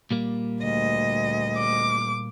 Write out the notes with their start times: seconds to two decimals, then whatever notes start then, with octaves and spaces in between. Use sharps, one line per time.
0.11 A#2 G3 A#3
0.62 D2 D#5
1.57 D6